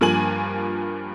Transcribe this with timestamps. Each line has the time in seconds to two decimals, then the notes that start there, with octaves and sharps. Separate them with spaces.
0.01 G2 F3 A#3 G#5 F#7